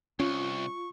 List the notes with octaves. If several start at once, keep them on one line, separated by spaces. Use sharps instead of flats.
C2 C#4 F4 C#6